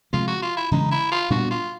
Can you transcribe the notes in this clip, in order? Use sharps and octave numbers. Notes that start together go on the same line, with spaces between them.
C3 F3 G#3 F4
F#4
F4
E4
C#3 E3 G#3 C#4 D#4
E4
F4
A#2 G3 B3 D4 F#4
F4